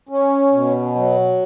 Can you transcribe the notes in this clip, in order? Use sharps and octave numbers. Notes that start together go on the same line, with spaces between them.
C#4
B2
F#3